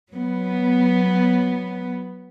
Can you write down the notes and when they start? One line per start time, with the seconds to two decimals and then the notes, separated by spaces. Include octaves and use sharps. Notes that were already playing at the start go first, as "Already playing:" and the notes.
0.10 F#3 B3